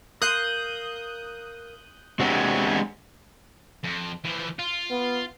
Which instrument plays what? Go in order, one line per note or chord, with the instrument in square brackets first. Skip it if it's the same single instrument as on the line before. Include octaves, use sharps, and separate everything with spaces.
[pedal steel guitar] A#4 F5 C6 [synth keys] D#6 F#6 G6
[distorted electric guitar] G#3 B3 [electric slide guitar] C4 D4 G4 [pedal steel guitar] F#4 A4 F#5
[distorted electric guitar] F2
E3 F3
F4
[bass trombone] B3